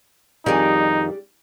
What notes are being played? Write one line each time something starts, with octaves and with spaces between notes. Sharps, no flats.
F2 D#3 G3 D4 D#4 G#4